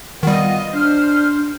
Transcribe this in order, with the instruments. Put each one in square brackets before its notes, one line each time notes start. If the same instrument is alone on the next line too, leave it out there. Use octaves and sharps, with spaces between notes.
[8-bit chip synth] D#3 G3 [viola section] B3 F4 D#5 [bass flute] F#5
[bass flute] D4 [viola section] C5 [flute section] F6